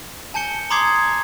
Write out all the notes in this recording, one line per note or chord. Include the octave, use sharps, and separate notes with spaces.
G#5 A5 G6 C#7 G7
A#5 C6 D6 D#6 G#6 C7